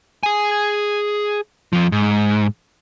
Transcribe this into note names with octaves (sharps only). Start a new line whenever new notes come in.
G#4 G#5
F2 F3
G#2